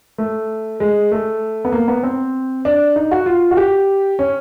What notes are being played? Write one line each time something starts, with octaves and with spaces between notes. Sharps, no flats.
A3
G#3
A3
B3
A#3
B3
C4
D4
D#4
F#4
F4
F#4
G4
C#4